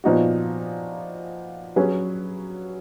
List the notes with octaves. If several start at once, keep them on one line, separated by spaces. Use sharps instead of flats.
A#2 F3 B3 D#4 F#4
F#3 C#4 G#4 B4